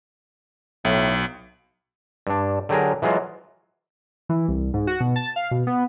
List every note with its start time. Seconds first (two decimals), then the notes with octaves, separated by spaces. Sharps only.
0.85 B1 A2
2.27 G2 D4
2.69 D3 F#3 G4 G#4 A#4
3.02 E3 F#3 G#3 F4
4.29 E3
4.48 C2
4.74 G#2
4.87 F#4
5.00 B2
5.16 A5
5.36 F5
5.51 B2
5.67 B3